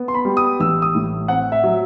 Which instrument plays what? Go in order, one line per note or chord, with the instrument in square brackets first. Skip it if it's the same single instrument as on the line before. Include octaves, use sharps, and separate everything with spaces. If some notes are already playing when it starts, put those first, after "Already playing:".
Already playing: [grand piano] B3
C6
B5
G3
D#6
A1 E6
D#6
A2
C4 F#5
E5
F#3